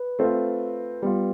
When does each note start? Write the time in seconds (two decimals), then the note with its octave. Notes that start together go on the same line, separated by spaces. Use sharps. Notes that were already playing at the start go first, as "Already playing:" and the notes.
Already playing: B4
0.19 A3 C4 F4
1.02 G3 B3 F4